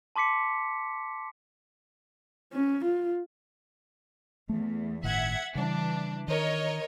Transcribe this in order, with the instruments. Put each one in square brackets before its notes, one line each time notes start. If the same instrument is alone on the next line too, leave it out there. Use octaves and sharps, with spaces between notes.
[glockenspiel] A5 C6 D6 B6 C#7
[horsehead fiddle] C#4
F4
[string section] E2 [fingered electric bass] A3
[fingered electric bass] G1 A2 D#3 [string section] E5 F#5 G#6
[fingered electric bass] C#3 G3 [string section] E3 D4
[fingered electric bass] D#3 [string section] A#4 C#5 D#5